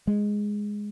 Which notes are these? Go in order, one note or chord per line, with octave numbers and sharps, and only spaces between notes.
G#3